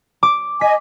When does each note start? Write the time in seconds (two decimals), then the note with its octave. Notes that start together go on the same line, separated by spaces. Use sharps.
0.23 D6
0.61 D#5 G#5 B6